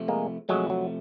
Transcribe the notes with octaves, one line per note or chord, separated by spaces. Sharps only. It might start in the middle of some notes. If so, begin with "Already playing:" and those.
Already playing: C3 F3 A3
G#3 A#3
C3 F3 F#3 G#3 A3
F#3